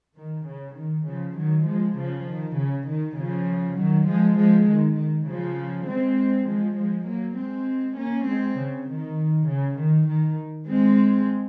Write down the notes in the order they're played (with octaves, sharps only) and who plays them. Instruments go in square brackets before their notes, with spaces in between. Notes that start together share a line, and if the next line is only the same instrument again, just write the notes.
[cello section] D#3
C#3
D#3
C#3 F3
D#3 F#3
F3 G#3
C#3 F3
D#3
C#3
D#3
C#3 F3
D#3 F#3
F3 G#3
F3 G#3
D#3
D#3
C#3 F3
G#3 C4
F3 G#3
F3 G#3
F#3 A#3
G#3 C4
A#3 C#4
G#3 C4
C#3
D#3
C#3
D#3
D#3
G#3 C4